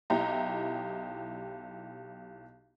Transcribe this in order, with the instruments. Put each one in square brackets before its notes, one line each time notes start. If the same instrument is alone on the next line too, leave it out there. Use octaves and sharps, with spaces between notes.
[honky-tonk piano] B1 E4 G4 D#5 A#5